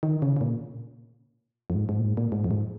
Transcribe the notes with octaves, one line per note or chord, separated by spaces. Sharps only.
D#3
C#3
C#3
A#2
F2
G#2
G#2
A#2
G#2
A#2
G#2
F2
G#2